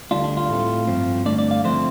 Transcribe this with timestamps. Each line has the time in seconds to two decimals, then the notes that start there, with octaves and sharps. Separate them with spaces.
0.11 D2 D3 G3 D4 F4
0.24 D4
0.37 F4
0.49 A2 A3 C4
0.87 G2 F3 C4
1.26 G2 D3 A3 D4 D5
1.39 D5
1.51 F5
1.64 D3 F3 A3 C4 C5